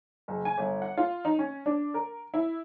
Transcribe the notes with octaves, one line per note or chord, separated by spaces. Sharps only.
F#1
G#5
G1
F#5
F4
D#4
C#4
D4
A#4
E4